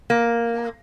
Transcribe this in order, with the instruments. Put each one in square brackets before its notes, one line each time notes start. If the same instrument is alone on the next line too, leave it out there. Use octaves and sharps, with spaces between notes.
[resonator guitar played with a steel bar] A#3